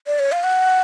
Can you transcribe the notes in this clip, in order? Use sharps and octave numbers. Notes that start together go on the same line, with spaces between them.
D5
C#5
F5
F#5